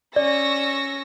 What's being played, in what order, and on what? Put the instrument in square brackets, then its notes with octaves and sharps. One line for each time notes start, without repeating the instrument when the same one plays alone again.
[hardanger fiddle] C#4 [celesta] D5 [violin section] C#6 E6 A#6